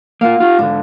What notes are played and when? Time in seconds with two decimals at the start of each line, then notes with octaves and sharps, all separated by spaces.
0.21 A#3 F4 F5 F#5
0.40 F4 G4
0.59 G#2 D3 D4